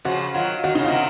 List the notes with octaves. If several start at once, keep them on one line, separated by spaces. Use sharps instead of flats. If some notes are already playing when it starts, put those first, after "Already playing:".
C#3 F3 F#4
D#3 F#3 F4
D#3 F#4
C#3 D#4
C3 D#3 F4